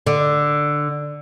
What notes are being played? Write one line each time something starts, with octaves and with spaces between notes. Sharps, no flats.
D3